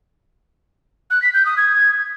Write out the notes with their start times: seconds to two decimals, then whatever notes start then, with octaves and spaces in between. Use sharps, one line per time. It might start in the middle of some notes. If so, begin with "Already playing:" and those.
1.10 F#6
1.22 B6
1.34 G6
1.45 D#6
1.57 G#6